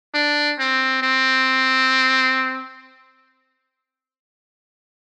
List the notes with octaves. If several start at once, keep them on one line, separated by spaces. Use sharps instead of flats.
D4
C4
C4